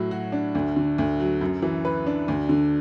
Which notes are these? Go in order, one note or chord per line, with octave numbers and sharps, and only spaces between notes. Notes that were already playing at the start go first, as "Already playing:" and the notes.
Already playing: A2 F#3
F#4
D4
D2
D3
D2
F#3
F#2
E3
B4
D4
D2
D3